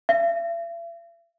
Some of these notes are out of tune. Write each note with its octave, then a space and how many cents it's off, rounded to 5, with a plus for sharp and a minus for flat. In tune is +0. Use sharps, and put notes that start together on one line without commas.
E5 +45